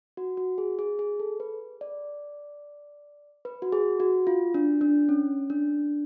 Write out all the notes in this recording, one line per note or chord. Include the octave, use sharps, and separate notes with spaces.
F#4
F#4
G#4
G#4
G#4
A4
B4
D5
B4
F#4
G#4
F#4
F4
D4
D4
C#4
D4